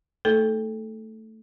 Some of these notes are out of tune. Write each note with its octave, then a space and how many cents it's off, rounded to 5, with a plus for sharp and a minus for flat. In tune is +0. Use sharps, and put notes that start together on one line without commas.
A3 +10 D#4 +10 A4 -15